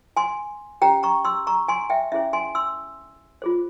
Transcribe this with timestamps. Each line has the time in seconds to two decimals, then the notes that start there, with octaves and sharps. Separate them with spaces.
0.17 G#5 C6
0.82 C#4 G4 C5 G5 A#5
1.03 A#5 C#6
1.25 C6 E6
1.47 A#5 C#6
1.68 G#5 C6
1.90 E5 G5
2.12 C#4 E4 G#4 C5 E5
2.33 G#5 C6
2.55 C6 E6
3.42 F4 G#4 C5